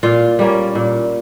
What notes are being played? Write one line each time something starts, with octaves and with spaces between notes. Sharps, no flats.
A#2 F4
G3 A#3 C#4
A#2